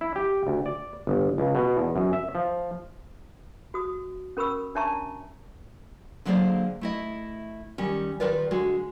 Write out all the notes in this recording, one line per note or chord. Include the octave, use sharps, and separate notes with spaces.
E4
G4
D2
D5
G1
C#2
B2
E2
F#2
E5
F3
F#4 D#6
C#4 A#4 B5 C#6 E6
D4 C#5 E5 A5 A#5 C#6
D3 F#3 G#3 A#3 C5 D5
A3 E4 D#5
D#3 G3 C#4
D#3 F4 A#4 B4 D5
D3 G#3 F#4